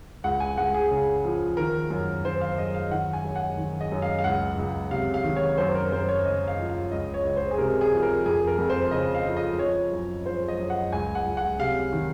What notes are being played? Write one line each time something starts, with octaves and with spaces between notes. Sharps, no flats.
C#2 F#5
G#5
C#2 F#5
G#4
C#3
F3
D#3 A#4
F#2
D#3 C5
F5
F#2 D#5
F5
D#3 F#5
G#5
F#2
F#5
D#3
D#5
F#2
F5
F5
C#2 F#5
C#2
C3 F5
F5
D#3
C#5
F#2 C5
A#4
F#2 C5
C#5
C#3 D#5
F5
F3
F5
C#2 D#5
C#5
C#2
C5
G#4
C3 A#4
G#4
F3
A#4
F2 G#4
A#4
F2
C5
C#3 D#5
F5
F3
D#5
F3 C#5
F#2
F3 C5
D#5
F#2
F#5
C#2 G#5
F#5
C#2
F#5
C3 F5
D#3